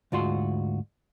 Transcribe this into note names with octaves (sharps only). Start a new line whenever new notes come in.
D2 G#2 F4 F#4 C6